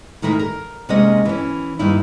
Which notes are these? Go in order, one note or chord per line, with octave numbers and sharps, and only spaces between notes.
A2 D#3 E3 A#4 E5
A#4
C3 G#3 A#3 C#4 D#5
E3 C#4
G2 D#3 A#3 D#4 E4